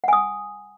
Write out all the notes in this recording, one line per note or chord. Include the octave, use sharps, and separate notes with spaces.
F#5 G#5 D#6